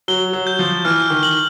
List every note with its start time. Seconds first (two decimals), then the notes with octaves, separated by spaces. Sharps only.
0.08 F#3 G7
0.33 F#3
0.47 G6
0.59 F3
0.85 E3 F6
1.10 D#3
1.23 F#7